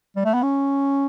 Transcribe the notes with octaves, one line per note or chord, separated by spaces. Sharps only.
G3
A3
B3
C#4